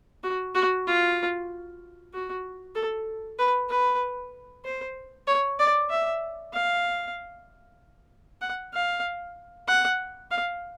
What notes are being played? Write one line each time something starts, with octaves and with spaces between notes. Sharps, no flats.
F#4
F#4
F4
F#4
A4
B4
B4
C5
C#5
D5
E5
F5
F#5
F5
F#5
F5